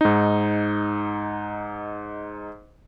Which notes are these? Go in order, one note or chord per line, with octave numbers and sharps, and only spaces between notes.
G#2 D#4